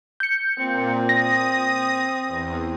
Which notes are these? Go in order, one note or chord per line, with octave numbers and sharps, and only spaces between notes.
G6 C#7
A#2 C4
D#6 A#6
E2